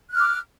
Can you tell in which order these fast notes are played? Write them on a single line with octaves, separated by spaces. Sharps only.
F#6 F6 D6